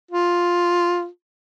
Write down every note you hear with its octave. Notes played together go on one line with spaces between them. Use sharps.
F4